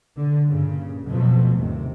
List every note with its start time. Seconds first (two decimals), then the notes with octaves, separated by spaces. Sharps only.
0.16 D3
0.48 G2 A#2 C#3
1.06 F2 B2 F3 F#3 A3
1.57 G1 D#2 C3